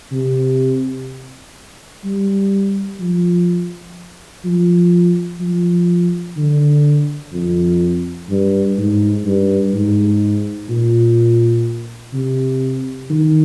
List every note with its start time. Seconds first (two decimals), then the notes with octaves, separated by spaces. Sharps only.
0.12 C3
2.04 G3
3.00 F3
4.44 F3
5.40 F3
6.37 D3
7.32 F2
8.29 G2
8.78 G#2
9.25 G2
9.73 G#2
10.69 A#2
12.13 C3
13.10 D#3